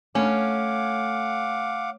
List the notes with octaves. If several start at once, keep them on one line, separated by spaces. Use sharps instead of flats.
A3 C#4 F5 F#5 D6